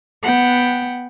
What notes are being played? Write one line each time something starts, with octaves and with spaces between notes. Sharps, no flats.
B3 F#5 G5